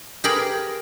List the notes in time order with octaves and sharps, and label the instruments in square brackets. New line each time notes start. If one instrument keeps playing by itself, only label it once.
[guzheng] G4 G#4 A#4 B5